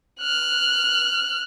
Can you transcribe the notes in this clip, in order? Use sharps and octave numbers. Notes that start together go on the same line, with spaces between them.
F6 F#6